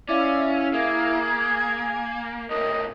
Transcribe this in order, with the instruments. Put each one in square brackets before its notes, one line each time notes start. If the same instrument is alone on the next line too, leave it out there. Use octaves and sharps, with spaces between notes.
[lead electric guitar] C#4 [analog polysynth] E4 E5 F5 [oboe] D5
[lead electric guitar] A#3 [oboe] G#4
[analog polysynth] G#5 G#6
[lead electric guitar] A2 C3 [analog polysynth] A#4 [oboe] D#5